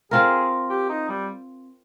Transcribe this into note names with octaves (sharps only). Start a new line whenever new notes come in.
C4 F4 G#4 A#4
G4
D#4
G3